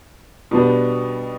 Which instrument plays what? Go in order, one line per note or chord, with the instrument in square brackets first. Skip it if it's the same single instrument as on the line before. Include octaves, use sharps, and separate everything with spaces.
[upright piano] B2 G3 B3 D4